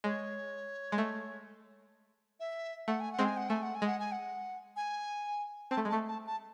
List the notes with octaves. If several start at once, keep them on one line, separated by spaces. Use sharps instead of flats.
G#3 C#5
G#3
A3
E5
A3 F#5
G#5
F#5
G#3 C4
G#5
F#5
A3 G#5
F#5
G#5
G#3 F#5
G#5
F#5
G#5
C4 A5
A3
G#3
A3 A5
A5
A5